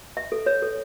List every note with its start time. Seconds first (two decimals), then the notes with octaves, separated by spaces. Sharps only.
0.17 E5
0.32 A4
0.46 C#5
0.62 A4